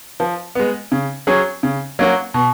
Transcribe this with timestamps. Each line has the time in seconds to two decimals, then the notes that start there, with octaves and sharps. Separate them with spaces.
0.20 F3
0.55 G#3 B3
0.92 C#3
1.27 F#3 C#4 G#4 C#5
1.63 C#3
1.99 F#3 A#3 C#4 F#4
2.34 B2